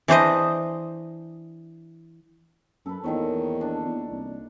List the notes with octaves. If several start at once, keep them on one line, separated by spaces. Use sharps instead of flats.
E3 D4 C5 D#5
F#2 A4 B4
E2 A#2 D#3 C#5
D4
E2
C2